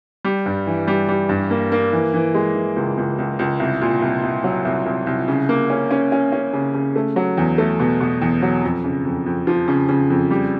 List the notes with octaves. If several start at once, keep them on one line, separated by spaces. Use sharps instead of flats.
G3
G2
E3
G3
G3
G2
A#3
A#3
E3
E3
G#3
E3
C#2
C#2
C#2
C#2
C2
A#2
C2
C2
F#3
C2
C2
C2
C#3
A#3
C#4
C#4
C#4
C#4
C#3
C#3
A3
F#3
E2
A3
B2
B2
E2
F#3
F2
C#3
F2
F2
F3
C#3
C#3
F2
G3